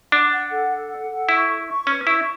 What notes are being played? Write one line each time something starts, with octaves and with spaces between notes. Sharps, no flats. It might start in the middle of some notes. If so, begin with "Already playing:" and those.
D4 F#5
F#5
A4
A4
F#5
A4
E4 C#6
C#6
C#6
C#4 B4
E4 C#6